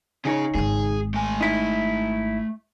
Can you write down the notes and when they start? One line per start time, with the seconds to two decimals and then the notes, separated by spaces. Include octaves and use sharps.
0.25 C#3 C#4 D#4 G#4 C#5
0.55 G#1 G#3 G#4
1.14 A3 G#5
1.41 D#4 E4